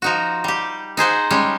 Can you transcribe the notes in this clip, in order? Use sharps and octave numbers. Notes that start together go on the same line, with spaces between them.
F3 D#4 F#4
G3 G4
D#4 G#4 C5 F#5
G3 G#3 C#4